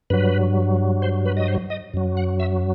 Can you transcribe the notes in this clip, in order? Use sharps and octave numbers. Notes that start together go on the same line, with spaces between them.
G2 F#3 B4
C5
B4
D#5
C5
D#5
F#2 F#3
F#5
E5